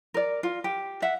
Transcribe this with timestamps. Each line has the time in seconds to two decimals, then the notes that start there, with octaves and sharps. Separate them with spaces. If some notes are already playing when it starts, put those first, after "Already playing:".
0.14 A#4 D5
0.43 F4
0.64 G4
1.02 E5 F#5